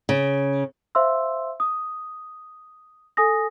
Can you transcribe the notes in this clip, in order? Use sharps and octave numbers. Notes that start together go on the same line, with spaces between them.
C#3
C5 E5 F5 C6 E6
D#6
A4 G#5 D#6 A#6